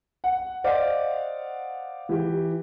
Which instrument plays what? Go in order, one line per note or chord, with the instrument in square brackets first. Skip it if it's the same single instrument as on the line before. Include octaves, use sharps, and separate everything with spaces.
[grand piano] F#5
C5 D5 D#5 F5 F#5 D6
E3 G4